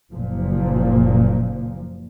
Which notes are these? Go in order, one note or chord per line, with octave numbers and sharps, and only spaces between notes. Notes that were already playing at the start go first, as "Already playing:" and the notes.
F#1 A#2 F3